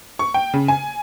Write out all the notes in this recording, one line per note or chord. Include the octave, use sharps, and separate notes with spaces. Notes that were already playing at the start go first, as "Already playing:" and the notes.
C#6
G5
C#3
G#5